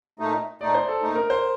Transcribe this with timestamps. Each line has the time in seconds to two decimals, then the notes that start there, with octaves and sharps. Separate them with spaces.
0.19 A#2 A3 D#4
0.61 A#2 A3 D#4 D5
0.74 C5
0.88 A4
1.02 A#2 A3 D#4
1.15 A#4
1.30 C5